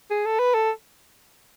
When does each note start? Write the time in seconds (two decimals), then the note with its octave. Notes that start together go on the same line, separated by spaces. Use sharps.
0.11 G#4
0.26 A4
0.39 B4
0.55 A4